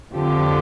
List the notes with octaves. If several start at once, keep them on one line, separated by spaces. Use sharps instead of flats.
F2 D3 F3 G4